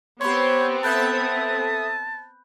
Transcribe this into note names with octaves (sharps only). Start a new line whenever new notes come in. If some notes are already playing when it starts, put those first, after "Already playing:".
B3 C4 G4 C5 C#5 B5 C6
A4 E5 A5 B5 D#6 F#6 G6